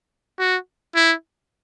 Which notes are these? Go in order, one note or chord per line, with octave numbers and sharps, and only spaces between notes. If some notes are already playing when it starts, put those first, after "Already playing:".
F#4
E4